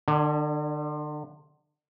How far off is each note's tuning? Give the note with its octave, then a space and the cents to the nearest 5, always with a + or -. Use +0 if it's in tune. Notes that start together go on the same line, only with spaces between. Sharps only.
D3 +40 D4 +0